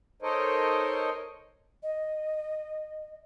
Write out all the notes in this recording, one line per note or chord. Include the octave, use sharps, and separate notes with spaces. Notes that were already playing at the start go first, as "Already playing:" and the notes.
D#4 A4 A#4 C5 C#5 D#5
D#5